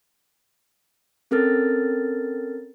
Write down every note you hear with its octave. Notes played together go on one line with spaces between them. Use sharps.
C4 C#4 A4 A#4 F6 A6